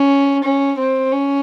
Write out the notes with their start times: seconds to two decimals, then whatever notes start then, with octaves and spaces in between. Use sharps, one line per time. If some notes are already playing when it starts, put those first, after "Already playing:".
Already playing: C#4
0.43 C#4
0.78 C4
1.12 C#4